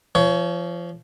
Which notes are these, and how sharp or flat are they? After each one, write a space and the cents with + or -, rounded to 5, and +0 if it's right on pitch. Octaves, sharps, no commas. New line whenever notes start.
F3 -25 C#5 +20